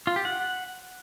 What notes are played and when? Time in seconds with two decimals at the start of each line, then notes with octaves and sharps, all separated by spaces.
0.07 F4
0.16 G4
0.25 F#5